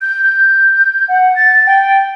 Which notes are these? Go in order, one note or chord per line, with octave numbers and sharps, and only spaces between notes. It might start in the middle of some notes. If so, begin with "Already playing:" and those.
G6
G6
F#5
A6
G5